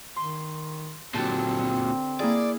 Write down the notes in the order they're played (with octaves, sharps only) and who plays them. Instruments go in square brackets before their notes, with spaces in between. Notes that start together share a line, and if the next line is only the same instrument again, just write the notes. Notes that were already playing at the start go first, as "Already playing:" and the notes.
[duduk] D#3 [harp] C6
[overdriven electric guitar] A#2 F#3 [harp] D3 G4 A5 [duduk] C4
[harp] A#3 E4 G#4 [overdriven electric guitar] D5